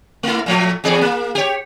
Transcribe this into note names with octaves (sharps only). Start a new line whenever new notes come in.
A3 E4
A#2 F3 A3
E2 G#4 D5
A#3
G4 C#5